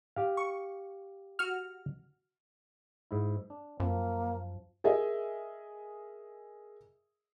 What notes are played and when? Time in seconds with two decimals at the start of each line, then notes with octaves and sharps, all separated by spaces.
0.16 G4 F5
0.37 C#6
1.39 F#4 F6
3.11 G#2 E4
3.50 D4
3.80 F#2 F3 A#3
4.84 G#4 A#4 D#5 E5